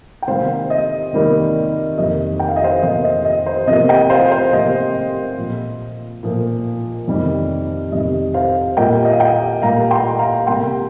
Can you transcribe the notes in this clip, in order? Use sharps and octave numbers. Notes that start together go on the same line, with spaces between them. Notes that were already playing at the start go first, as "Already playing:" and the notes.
G5
C3 D#3 G3 A#3 C5 F5
D#5
C3 D#3 G3 A#3
F2 C3 D#3 A#3 D#5
G5
F5
D#5
C5 F5
F2 C3 D#3 A#3 D#5
D#5
D#5
C5
C3 F3 A#3 D#5
D#5 G5
C5 F5
C5 F5
C3 F3 A#3 D#5
A#2 F3 A#3
A#2 F3 A#3
F2 C3 D#3 G3
F2 C3 D#3 G3 D#5
C5 F5
A#2 G3 A#3 D#5 G5
D#5
F5
D#5 G5
A#2 G3 A#3 F5 A#5
G5 C6
F5 A#5
C3 G3 A#3 G5 C6